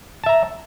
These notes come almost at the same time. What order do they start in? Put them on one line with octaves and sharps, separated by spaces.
A5 E5 A#5